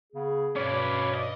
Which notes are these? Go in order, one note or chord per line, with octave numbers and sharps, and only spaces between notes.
C#3 B3 G#4
G2 B2 C#4 B4 C#5 D5
D#5